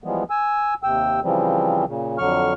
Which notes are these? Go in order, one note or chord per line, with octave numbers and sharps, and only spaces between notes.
E3 F3 G3 G#3 B3
G#5 E6
D#2 C3 G5 E6
C#3 E3 F3 G3 C4
A#2 C#3
F2 D3 F#3 C#6 F6